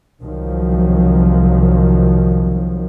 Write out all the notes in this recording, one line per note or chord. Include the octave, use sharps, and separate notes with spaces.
C2 D#3 F3 F#3